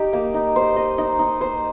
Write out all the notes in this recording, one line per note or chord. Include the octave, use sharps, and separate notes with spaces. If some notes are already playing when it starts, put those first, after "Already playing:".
Already playing: D#4 G4
A#3
D#4
C5
D#5
D#4
D#4
C5